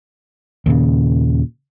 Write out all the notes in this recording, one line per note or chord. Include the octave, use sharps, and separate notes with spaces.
D#2 A#2 C#3